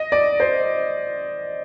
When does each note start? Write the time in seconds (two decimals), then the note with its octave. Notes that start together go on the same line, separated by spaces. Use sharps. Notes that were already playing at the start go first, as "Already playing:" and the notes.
Already playing: D#5
0.12 D5
0.40 C5